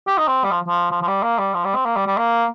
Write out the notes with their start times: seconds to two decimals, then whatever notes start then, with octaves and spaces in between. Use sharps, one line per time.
0.07 G4
0.18 D#4
0.28 C4
0.44 G3
0.51 F3
0.67 F3
0.91 F3
1.02 F3
1.07 G3
1.22 A#3
1.38 G3
1.54 F3
1.64 G3
1.75 C4
1.85 A#3
1.96 G3
2.07 G3
2.17 A#3